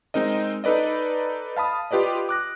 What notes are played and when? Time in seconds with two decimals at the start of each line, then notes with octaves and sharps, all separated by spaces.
0.14 G#3 C4 D#4 A#4 D#5
0.64 D#4 A4 B4 D5 D#5
1.57 F5 A5 B5 D#6
1.91 F4 G4 B4 D5 D#5
2.29 D6 F#6 A#6